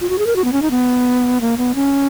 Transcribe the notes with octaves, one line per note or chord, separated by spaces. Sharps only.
F4
F#4
G#4
A#4
F#4
B3
C#4
D#4
B3
A#3
B3
C#4